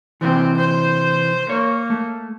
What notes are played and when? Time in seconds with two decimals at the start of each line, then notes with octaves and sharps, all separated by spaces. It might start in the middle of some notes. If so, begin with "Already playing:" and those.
0.21 C3 E3 C4
0.57 C5
1.50 A#3 C#5
1.90 A3